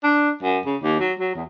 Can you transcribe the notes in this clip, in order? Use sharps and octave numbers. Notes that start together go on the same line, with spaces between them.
D4
F#2
C#3
D#2
F#3
F#3
E2